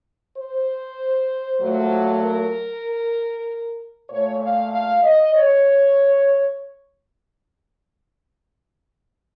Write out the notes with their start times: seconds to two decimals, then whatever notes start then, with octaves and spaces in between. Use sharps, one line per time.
0.36 C5
1.61 A#2 F#3 A3
2.22 A#4
4.09 A#2 A3 C#5
4.41 F5
4.72 F5
5.03 D#5
5.34 C#5